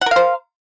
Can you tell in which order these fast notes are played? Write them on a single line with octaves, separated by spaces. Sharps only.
F#5 A#4 F5 C5